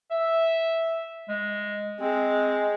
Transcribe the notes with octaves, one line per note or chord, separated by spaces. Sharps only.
E5
G#3
G#3 C4